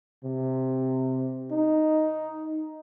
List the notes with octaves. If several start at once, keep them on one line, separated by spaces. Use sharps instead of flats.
C3
D#4